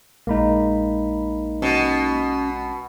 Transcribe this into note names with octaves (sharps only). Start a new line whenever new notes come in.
A#1 G#3 A#3 D#4 B5
B2 C#4